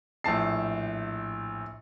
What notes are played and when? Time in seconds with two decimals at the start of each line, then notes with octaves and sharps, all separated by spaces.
0.24 A#1 A2 A5 C7